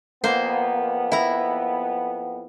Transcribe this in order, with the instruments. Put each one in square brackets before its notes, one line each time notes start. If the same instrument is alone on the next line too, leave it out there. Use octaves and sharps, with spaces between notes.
[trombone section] F2 B3 [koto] A#3 C5
[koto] E4 A#5